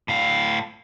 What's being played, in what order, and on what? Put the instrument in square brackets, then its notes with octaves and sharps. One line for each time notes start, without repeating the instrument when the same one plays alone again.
[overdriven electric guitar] A2 F5